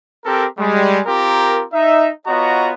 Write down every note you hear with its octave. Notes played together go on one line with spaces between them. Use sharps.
C4 G4 A4 A#4
G3 G#3
C4 F4 G4 A#4
D#4 E5
B3 F4 F#4 C#5 D#5 A#5